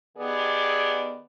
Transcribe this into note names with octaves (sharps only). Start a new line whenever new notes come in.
D#3 B3 G4 G#4 D5